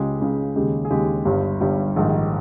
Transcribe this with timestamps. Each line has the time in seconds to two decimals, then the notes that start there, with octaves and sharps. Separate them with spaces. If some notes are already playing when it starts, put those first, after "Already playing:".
Already playing: C#2 C#3 G#3 G4
0.20 C#2 C#3 G#3
0.56 D#2 C#3 G#3 G4
0.85 G#4
0.90 D#2 C#3 G#3 G4
1.25 G1 G2 G3
1.60 G1 G2 G3 G4
1.96 A#1 G#2 D#3